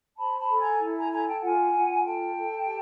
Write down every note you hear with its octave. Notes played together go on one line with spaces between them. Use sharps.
C5 A5 B5
A5 B5
A4
G#5 A#5
E4
G#5 A#5
A4 G#5 A#5
G5 A5
F4 F#5 G#5
F4
A4 G5 A5
A4
G4